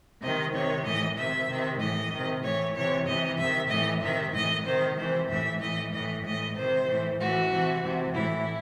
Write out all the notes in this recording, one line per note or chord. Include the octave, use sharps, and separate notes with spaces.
C3 D#3 D#5
C3 D#3 C#5
A2 E3 D#5
C3 D#3 E5
C3 D#3
A2 E3 D#5
C3 D#3
A2 E3 C#5
C3 E3 C#5
C3 E3 D#5
C3 E5
D#3
A2 E3 D#5
C3 D#3 E5
A2 E3 D#5
C3 D#3 C5
C3 E3 C5
A2 E3 E5
A2 E3 D#5
A2 E3 D#5
A2 E3 D#5
C3 D#3 C5
A2 E3
A2 E3 F#4
C3 E3
C3 E3
A2 E3 E4